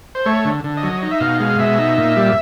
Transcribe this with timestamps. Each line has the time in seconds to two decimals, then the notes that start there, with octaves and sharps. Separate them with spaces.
0.15 C5
0.26 A3 C#5
0.45 D3
0.64 D3
0.77 D#5
0.83 F#3
1.02 D#4
1.11 E5
1.20 B2 F5
1.40 G#3 F5
1.59 B2 E5
1.79 D#4
1.98 A#2
2.16 G3